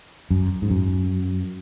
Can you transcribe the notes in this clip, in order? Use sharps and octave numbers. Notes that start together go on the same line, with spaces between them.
F#2
G#2
F#2